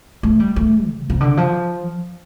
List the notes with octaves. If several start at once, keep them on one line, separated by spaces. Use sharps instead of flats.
A3
G3
A3
C3
C3
D3
F3